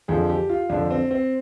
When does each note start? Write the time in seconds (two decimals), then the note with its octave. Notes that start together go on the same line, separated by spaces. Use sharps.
0.08 F2 D3 F3 G#4
0.30 G4
0.49 F4
0.69 F2 D3 F3 D4
0.91 C4
1.11 C4